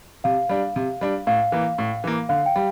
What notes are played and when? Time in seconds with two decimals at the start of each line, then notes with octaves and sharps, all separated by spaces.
0.24 C3 F5
0.49 G3 D4
0.76 C3
1.01 G3 D4
1.27 A2 F5
1.52 E3 A#3
1.78 A2
2.04 E3 A#3
2.29 D3 F5
2.46 G5
2.56 G3